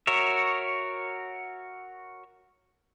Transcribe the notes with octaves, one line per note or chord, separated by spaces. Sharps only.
F#4 A#4 C#5 E5